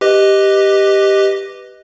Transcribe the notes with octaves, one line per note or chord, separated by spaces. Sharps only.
G4 B4 D#5